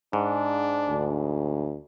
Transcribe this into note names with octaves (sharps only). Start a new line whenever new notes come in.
G#2 D4
D2